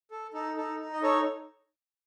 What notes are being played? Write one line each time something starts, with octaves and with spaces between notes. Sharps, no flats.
A4
D#4 A4
D#4 A4
D#4
D#5
D#4 A4 C#5